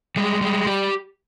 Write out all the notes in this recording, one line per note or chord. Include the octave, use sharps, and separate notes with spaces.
G3 G#3
G3 G#3
G3 G4